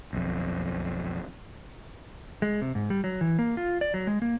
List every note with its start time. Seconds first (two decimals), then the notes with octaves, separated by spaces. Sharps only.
0.13 B1 F2
2.42 G#3
2.62 C3
2.75 G#2
2.90 G3
3.04 F#3
3.21 E3
3.39 A#3
3.57 F4
3.81 D5
3.94 F#3
4.07 G#3
4.22 A#3